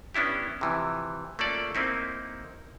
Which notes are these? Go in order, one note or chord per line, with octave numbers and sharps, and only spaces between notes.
B3 C#4 D4 E4 G4
C3 E3 F3
A3 A#3 C#4 F4 A4 D5
A#3 C4 D#4 E4